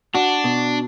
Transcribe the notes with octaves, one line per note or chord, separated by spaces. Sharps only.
D4 F#4
B2